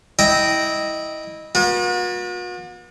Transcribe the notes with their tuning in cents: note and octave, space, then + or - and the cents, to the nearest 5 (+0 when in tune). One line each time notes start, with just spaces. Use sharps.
E4 -20 D#5 -10 G5 -10
B3 -45 F#4 -45